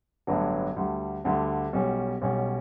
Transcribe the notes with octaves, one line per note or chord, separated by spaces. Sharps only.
A1 G2 D3 F#3 B3
D2 D3 G3
D2 D3 G3
B1 B2 G3 C#4
B1 B2 G3 C#4